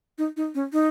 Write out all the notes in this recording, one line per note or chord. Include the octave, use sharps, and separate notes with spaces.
D#4
D#4
C#4
D#4